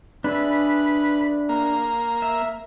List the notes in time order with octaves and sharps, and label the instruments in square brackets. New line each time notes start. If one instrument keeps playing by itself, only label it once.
[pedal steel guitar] D4 G#4 E5 [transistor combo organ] B4
[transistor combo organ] A#3
[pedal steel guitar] E5